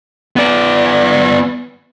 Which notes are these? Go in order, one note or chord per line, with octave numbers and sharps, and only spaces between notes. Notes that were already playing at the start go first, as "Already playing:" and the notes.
B3 D5